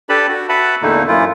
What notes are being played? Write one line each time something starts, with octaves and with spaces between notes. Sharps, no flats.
D4 G4 A4 B4 A5 B5
F#4
F#4 B4 E5 F#5 A5 B5
E2 A#2 D3 A3 A#3 D#4
F#2 E3 E4 F4